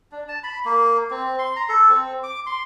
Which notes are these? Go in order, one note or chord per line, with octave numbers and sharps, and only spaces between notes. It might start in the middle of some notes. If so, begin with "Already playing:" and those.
D4
A5
B5
A#3
C4
C6
A#5
A4
C4
D6
C6